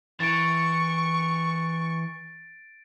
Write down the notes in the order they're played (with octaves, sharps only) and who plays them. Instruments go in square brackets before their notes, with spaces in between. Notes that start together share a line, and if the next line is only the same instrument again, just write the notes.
[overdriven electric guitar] E3 [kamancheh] C#6 [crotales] A6 D7